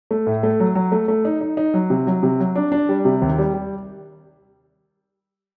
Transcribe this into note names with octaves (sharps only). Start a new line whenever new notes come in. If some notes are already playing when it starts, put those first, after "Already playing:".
A3
A2
A3
F#3
F#3
A3
A3
D#4
D#4
D#4
F#3
C3
F#3
C3
F#3
D4
D4
G3
C3
D#2
G3
G3